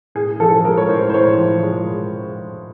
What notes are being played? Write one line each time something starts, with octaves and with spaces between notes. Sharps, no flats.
A2 G#4
F3 A4
G#3 A#4
C#5
A2 C5
C5
A2 C#5
F3
G#3